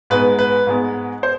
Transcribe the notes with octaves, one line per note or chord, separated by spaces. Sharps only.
G#2 G#3 B3 B4
B4
G#2 G#3 B3
C5